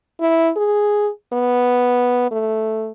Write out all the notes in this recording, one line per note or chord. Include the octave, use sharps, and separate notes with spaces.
E4
G#4
B3
A3